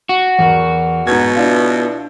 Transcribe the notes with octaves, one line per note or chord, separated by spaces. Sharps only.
F#4
E2 A#4 C#6
G#2 B2 A#5 G#6
D4 E4 F4